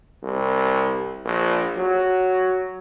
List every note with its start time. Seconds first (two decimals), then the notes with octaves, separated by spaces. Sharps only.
0.23 C2
1.25 A#1
1.77 F#3